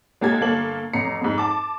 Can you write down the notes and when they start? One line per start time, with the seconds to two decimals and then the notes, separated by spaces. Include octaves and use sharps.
0.21 G#3 A#3 G4 A4 G#6
0.41 G1 A#3 A4 F#7
0.93 A1 F2 A#5 C7 C#7
1.21 F2 G#2
1.38 A5 D6